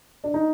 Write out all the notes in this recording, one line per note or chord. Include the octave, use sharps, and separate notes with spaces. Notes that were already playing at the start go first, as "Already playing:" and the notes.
D4
D#4